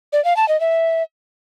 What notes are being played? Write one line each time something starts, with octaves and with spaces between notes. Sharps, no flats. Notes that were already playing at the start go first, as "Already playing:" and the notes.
D5
F5
A5
D#5
E5